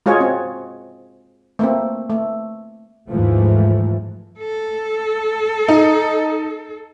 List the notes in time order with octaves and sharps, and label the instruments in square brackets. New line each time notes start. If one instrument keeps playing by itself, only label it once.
[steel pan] G#3 F4 F#4 G#4 C#5
C4
A3 A#3 C4
A3
[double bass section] D#2 G#2 E3 F3 A3
[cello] A4
[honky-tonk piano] D#4